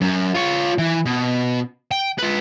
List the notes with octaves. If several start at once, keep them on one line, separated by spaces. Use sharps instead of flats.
F#2
F4 C#5
E3
B2
G5
F4 B4